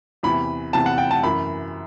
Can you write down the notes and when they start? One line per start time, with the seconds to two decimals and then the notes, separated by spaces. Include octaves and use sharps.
0.23 E2 C3 E3 B5
0.73 E2 C3 E3 A5
0.86 F#5
0.98 G5
1.11 A5
1.23 F#2 E3 B5